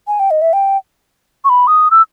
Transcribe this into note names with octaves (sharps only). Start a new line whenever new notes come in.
G#5
G5
D#5
E5
G5
C#6
B5
D#6
E6